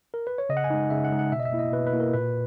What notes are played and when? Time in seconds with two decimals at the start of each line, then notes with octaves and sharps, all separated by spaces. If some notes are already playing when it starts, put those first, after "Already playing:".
0.14 A#4
0.27 B4
0.38 C#5
0.49 C#3 D#5
0.57 F#5
0.64 G#5
0.70 G#3 D#4
0.90 C#3 E5
1.04 F#5
1.11 G#3 D#4
1.19 F#5
1.32 B2 E5
1.40 D#5
1.45 E5
1.52 A#3 E4
1.59 D#5
1.72 B2 B4
1.87 B4
1.93 A#3 E4
2.00 A#4
2.13 A#2 B4